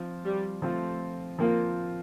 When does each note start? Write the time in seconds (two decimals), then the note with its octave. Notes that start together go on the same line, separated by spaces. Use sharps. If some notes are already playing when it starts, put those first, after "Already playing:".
Already playing: F3 C4 F4
0.24 G3
0.62 F3 A3 C4 F4
1.39 F3 A#3 C4 F4